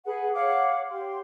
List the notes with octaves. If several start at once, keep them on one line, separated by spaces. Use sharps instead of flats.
G#4 B4 F#5
C#5 F5 F#5 D6
G4 C6